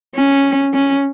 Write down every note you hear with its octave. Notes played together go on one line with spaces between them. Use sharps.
C#4
C#4